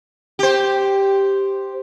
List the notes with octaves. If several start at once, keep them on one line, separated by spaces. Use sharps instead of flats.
G4 C5